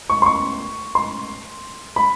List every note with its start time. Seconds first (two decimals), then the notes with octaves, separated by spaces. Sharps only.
0.10 C#6
0.22 C6
0.26 C#6
0.95 C6
1.96 B5